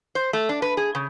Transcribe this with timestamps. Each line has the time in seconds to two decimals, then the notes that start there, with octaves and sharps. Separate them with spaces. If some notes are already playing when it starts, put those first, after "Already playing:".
0.15 C5
0.33 A3
0.49 D4
0.62 B4
0.77 G#4
0.95 C#3